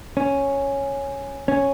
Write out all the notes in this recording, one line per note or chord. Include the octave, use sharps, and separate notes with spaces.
C#4
C#4